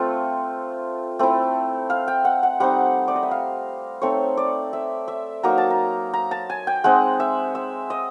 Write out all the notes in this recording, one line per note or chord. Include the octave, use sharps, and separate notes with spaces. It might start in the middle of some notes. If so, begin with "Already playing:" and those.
Already playing: A3 C4 F4
A3 C4 E4
F5
G5
F#5
F#5
G3 C4 D#4 F#5
D5
D#5
E5
F5
A3 C4 D#4 C#5
D5
E5
E5
F#3 A#3 D#4 A#5
A5
A#5
A#5
A5
G#5
G5
G#3 C4 D#4 F#5
E5
E5
D#5